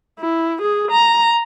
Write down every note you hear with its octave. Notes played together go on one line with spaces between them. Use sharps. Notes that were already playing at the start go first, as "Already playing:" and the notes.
E4
G#4
A#5